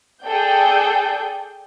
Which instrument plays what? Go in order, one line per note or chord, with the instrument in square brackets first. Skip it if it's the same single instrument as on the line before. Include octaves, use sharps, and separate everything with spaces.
[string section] G#4 A4 D5 G5 G6